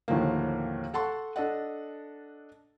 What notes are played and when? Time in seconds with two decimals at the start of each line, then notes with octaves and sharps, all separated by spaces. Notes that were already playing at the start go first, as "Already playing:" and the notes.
0.08 D#2 A2 D3 D#3 F3 A#3
0.94 A4 F#5 A5 C6 C#6
1.36 D4 A4 D#5 F#5